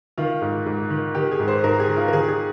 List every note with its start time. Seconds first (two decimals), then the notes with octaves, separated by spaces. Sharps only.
0.18 D#3 F4
0.42 G#2
0.66 G#2
0.90 D#3
1.15 D#3 G4
1.31 G#4
1.40 G#2
1.48 C5
1.64 G#2 A#4
1.80 G#4
1.88 D#3
1.97 F4
2.08 A#4
2.13 D#3 G#4
2.29 G#4